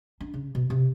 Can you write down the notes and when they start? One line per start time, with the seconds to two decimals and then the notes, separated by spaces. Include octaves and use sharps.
0.20 D4
0.34 C#3
0.55 B2
0.70 C3